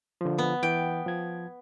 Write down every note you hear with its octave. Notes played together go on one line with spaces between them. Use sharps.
D3 F3
B3
E3 G5
F3 G#6